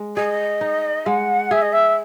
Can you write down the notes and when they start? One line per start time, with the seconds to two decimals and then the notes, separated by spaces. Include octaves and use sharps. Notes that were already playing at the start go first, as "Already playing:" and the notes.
Already playing: G#3
0.16 G#4 D#5
0.61 D#4
1.06 G#3 F#5
1.51 G#4 E5
1.61 D#5
1.72 E5